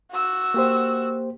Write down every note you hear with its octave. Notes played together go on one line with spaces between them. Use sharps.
F#4 E6
A#3 G4 C5